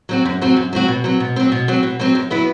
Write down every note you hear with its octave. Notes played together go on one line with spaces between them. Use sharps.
F#3 C4 F#4
F#2
F#3 C4 F#4
F#2
F#3 C4 F#4
B2
F#3 C4
B2
F#3 C4
B2
F#3 C4
B2
F#3 C4
F#2
F#3 B3 E4